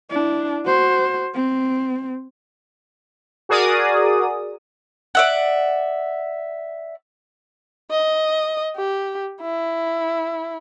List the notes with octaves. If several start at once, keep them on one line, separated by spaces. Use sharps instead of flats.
D4 E4
F#4 C5
C4
F#4 G#4 A#4 D5 D#6
D5 E5 F#5
D#5
G4
E4